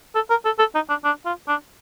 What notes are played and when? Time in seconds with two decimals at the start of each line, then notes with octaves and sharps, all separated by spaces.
0.15 A4
0.30 A#4
0.45 A4
0.59 A4
0.75 D#4
0.89 D4
1.04 D4
1.26 F4
1.48 D4